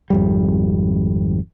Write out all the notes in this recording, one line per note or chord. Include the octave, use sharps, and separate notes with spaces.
G#1 F2 G3